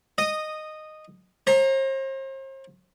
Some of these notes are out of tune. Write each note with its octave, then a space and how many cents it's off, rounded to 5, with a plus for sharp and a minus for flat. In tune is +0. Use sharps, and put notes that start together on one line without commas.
D#5 -10 D#6 +0
C5 +40 A#5 +0